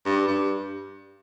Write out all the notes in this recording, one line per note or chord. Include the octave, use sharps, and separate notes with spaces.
G2
G2